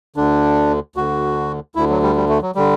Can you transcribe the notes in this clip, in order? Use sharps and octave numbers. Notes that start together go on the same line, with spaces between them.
D2 D3 D4
D2 D3 F#4
D2 D3 E4
F#3
G3
G3
A3
F#3
D3 G3